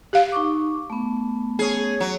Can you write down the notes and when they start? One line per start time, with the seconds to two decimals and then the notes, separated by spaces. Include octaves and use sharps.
0.13 G4 F5
0.32 D#4 C#6 D6
0.90 A3 B3
1.59 C#4 G#4
2.00 F#3